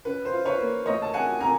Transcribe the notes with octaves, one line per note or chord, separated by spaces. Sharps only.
C#4 B4
C5
F4
B4 C#5
A#3
A3 C#5 D#5
A5
C3 F#5 G#5
C3 G#5 A#5